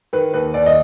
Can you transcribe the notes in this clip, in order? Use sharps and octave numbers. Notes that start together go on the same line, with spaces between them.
D#3 B4
D#2 B4
D#2 D5
D#5